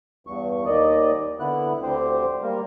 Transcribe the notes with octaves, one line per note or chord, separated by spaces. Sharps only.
E2 G2 C#6
D#2 D#3 D5 D#5
D3 B3 E4 F#6
D2 D3 C4 G4 C5
G3 A#3 A#4